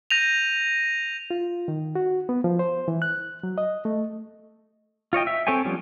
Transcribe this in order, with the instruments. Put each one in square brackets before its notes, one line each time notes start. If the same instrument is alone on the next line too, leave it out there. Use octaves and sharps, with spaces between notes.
[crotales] G6 A#6 D#7 F7
[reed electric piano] F4
D#3
F#4
B3
F3
C5
E3
F#6
F#3
D#5
A3
[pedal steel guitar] F4 C#5 D#5 G5
E5
C4 A4 C#5 G5 G#5
F3 G3 B3 C#4